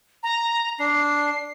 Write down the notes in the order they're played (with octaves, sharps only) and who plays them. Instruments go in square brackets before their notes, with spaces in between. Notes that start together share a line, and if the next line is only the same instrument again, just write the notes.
[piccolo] A#5
[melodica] D4 [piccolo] C7